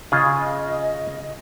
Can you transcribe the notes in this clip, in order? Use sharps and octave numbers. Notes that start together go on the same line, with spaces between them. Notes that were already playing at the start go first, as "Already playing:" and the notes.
C#3 F4 G#4 D#5